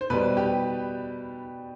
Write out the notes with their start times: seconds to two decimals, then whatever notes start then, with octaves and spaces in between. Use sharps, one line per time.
0.01 C5
0.10 B2 G3 B4
0.37 G4